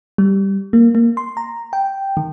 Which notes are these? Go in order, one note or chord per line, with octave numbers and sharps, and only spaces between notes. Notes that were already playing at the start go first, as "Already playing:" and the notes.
G3
A#3
A#3
C6
A#5
G5
D#3